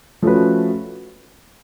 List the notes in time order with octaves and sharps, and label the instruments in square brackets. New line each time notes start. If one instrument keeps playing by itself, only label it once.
[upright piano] F3 A3 C#4 F#4 B4